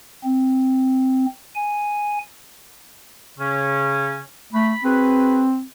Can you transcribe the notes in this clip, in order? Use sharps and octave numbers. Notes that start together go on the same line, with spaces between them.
C4
G#5
C#3 C#4
A3 B5
C4 F#4 G#4 B4